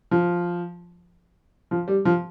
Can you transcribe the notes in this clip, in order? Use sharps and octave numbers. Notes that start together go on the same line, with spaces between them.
F3
F3
G3
F3